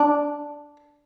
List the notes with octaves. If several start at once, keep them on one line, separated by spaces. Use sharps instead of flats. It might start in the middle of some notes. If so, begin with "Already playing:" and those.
Already playing: D4